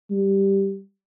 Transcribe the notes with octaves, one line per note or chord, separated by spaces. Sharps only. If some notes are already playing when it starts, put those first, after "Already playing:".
G3